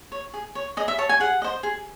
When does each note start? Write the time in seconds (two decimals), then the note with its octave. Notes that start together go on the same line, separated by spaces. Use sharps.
0.12 C#5
0.34 G#4
0.55 C#5
0.77 G#4 D#5
0.88 E5
0.98 C#5 A5
1.09 G#5
1.20 G#4 F#5
1.42 C5 D#5
1.63 G#4